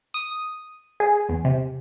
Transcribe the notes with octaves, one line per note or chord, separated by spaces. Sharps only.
D#6
G#4
E2
C3